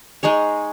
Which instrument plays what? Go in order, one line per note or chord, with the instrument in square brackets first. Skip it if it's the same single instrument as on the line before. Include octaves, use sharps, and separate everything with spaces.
[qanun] G#3 D#4 G#4 C#5